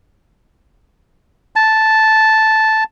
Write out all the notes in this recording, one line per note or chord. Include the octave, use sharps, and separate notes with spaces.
A5